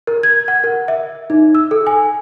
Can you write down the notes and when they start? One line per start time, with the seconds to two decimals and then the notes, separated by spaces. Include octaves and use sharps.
0.07 A#4
0.23 G#6
0.48 F#5
0.64 A#4
0.88 E5
1.30 D#4
1.55 E6
1.71 A4
1.87 G#5